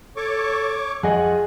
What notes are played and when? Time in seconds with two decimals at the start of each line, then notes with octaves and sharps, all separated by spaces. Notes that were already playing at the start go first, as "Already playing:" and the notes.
0.16 A4 C#5 C#6 D6
1.03 F2 F4 G#4 D#5 F#5 G#5